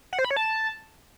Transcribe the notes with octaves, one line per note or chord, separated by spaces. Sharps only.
F#5
C5
B5
C#5
A5